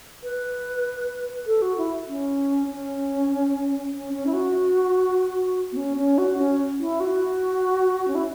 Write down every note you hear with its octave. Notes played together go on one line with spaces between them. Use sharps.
B4
A4
F#4
E4
C#4
C#4
C#4
C#4
E4
F#4
B3
C#4
C#4
F#4
C#4
E4
F#4
C#4
E4